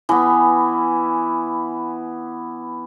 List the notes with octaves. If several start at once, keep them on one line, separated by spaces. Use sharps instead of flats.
E3 B3